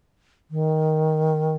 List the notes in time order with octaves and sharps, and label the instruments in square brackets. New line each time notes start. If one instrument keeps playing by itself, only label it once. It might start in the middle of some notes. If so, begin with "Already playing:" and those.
[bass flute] D#3